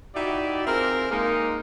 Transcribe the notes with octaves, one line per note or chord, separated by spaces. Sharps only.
D#4 E4 F#4 G4 D5 E5
C4 F4 G#4 A#4
G#3 A#3 D#4